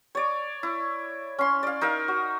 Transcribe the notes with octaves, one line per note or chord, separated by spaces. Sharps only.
C#5 D5
E4
C#4 C6
D5 F5
D#4 A#4 E5 F5
F#4